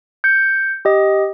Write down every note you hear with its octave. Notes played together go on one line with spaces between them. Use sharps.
G6 C#7
G4 D#5